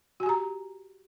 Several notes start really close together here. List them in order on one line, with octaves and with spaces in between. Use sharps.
F#4 G#5 G4 A#5